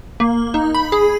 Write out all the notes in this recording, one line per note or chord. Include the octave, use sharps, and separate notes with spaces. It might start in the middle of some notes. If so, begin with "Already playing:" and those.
A#3
D#4
B5
G#4